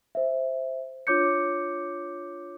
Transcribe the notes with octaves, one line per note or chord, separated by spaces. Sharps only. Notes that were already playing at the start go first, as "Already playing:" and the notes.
C5 E5
D4 F4 C#5 D6 G6 C#7